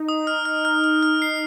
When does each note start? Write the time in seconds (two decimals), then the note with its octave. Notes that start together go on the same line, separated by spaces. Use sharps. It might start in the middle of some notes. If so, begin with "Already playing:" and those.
Already playing: D#4
0.09 D#6
0.27 F6
0.45 F6
0.65 F6
0.84 F6
1.03 F6
1.22 C7